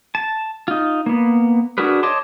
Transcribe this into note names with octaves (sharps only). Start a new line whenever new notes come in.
A5
D#4 F4
A#3 B3
D4 F#4 G#4 A#4 B4
C#5 D#5 A5 C6 D6